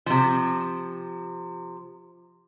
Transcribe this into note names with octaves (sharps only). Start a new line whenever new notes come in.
C3 F3